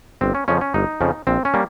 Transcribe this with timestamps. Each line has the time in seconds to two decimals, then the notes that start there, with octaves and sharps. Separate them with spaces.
0.21 G1 C4
0.35 C#4
0.48 F2 C#3 F3 C#4
0.61 C#4
0.74 G1 D#4
1.01 F2 C#3 F3
1.27 A#1 C4
1.45 C#4
1.54 G3 A#3